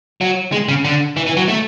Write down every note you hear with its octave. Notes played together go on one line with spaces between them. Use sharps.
F#3
G#3
C#3
D3
E3
E3
F#3
A3